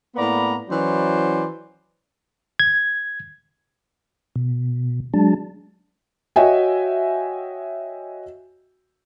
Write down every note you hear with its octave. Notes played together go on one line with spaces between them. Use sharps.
A2 A#3 B3 D5 A#5 B5
E3 F#3 C#4 E4 C5 D5
G#6
B2
F#3 G#3 D4 A5
F#4 C#5 D#5 E5 G5 G#5